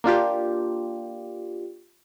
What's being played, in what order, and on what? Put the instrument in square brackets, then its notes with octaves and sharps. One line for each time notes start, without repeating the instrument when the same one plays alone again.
[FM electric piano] A#3 D4 F4 G4